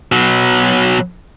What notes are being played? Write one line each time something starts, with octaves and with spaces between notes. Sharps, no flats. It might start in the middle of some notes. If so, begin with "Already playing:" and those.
B2 F#3